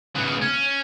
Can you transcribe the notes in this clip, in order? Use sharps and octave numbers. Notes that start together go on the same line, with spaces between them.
C#3 B3
C#4